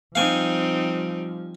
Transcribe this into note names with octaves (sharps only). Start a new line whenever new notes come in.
F3 G3 C4 D#4 F5 G#5